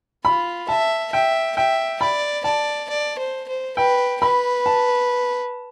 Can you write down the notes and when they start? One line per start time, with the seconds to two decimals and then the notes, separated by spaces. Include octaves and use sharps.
0.25 F4 B5
0.68 E5 A5
1.13 E5 G5
1.57 E5 G5
2.01 D5 B5
2.44 D5 A5
2.89 D5
3.19 C5
3.48 C5
3.77 B4 G5
4.21 B4 B5
4.66 A5